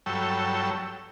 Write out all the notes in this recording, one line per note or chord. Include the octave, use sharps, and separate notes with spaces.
G2 F#3 A4 C#5 G5 E6